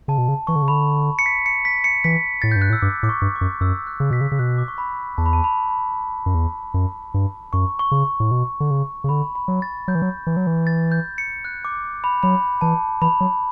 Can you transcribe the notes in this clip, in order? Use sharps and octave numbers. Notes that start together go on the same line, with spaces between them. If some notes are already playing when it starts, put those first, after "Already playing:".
C#3 A5
B2
C#3
E3 C#6
D3
C#3
D3 B5
C#7
B6
C#7
B6
C#7
E3 B6
A2 A6
G2 G6
F#6
A2
E6
G2 D6
A2 D6
C#6
G2
D6
F#2
F#2 E6
F#6
C#3
B2 B6
C#3
C#3
B2 F#6
D6
C#6
B5
E2 A5
B5
A5
B5
B5
F#2
E2
F#2
G2
F#2 C#6
C#6
C#3
A2
B2
D3
C#3
C#3
D3 B5
B5
F#3
A6
F#3 G6
E3
F#3
E3
F#3
E3
A6
G6
C#7
F#6
D6
B5
F#3 B5
E3 A5
E3 B5
F#3